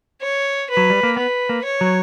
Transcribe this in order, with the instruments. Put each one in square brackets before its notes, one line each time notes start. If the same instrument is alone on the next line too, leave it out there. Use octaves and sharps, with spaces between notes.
[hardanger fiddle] C#5
B4
[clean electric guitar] F#3
G3
A#3
[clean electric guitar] B3 [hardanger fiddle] B4
[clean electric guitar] A#3
[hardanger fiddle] C#5
[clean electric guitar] F#3